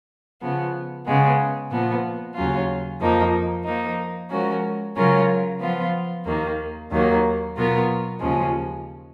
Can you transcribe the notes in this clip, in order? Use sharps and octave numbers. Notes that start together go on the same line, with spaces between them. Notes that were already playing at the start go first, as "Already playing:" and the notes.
C#3 F3 B3
C#3 G#3 B3
A#2 F3 B3
D#2 C#3 F#3 C#4 F4
F2 F3 A#3 D#4
F3 A#3 D#4
F3 G#3 C#4 F#4 A#4
C#3 F#3 C#4 F4 A#4
F3 B3 F4
D#2 D#3 A#3
D#2 D#3 F#3 A#3
B2 F#3 B3 F4 A#4
D#2 C#3 F3 G#3 C#4